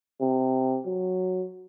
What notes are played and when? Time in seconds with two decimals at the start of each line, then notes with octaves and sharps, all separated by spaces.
0.21 C3
0.86 F#3